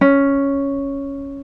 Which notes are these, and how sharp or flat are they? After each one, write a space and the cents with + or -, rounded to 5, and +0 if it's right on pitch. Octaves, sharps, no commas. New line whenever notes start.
C#4 +0